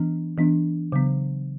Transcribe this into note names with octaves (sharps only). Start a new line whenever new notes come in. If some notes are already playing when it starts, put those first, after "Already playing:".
Already playing: E3 B3 D4
E3 B3 D4
C#3 F#3 B3